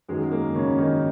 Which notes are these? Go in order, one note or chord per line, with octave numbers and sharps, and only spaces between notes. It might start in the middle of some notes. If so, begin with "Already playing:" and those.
F#2 D#3 F#3 G#3
G#3
A#3
C#3 C#4
D#3 D#4